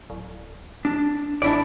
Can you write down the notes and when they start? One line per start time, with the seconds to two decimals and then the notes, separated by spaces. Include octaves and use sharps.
0.10 D1
0.85 D4
1.42 G#1 D4 E4 D5